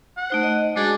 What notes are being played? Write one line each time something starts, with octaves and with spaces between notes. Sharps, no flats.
F#5
A3 D#4 C5
D#5
G#3 D4 F#4 G#4